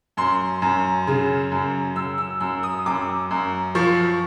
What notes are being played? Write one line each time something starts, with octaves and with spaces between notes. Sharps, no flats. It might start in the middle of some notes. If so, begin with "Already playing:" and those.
F#2 C6
F#2
C#3
F#2
F#2 E6
E6
F#2 E6
D#6
F#2 D6
F#2
F3 C#6